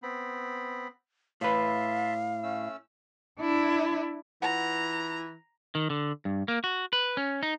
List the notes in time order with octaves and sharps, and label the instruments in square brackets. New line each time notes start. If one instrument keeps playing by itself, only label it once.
[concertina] B3 C4 B5
[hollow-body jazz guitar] A2 B4 [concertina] E5 A5 C6 [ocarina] F5
[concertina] A3 C#4 E6
[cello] D4 E4
[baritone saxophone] E3 [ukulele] F4 F#5 [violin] A#5
[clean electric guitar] D#3
D3
G2
A#3
F#4
B4
C#4
D#4